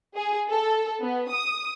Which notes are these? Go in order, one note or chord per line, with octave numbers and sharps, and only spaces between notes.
G#4
A4
B3
D#6